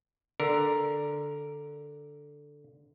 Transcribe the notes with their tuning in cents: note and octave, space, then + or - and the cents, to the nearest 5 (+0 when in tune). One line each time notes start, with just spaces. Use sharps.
D3 +0 A#4 +0